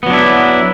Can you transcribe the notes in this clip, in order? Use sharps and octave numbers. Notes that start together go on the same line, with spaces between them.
F#3 B3 D4 E4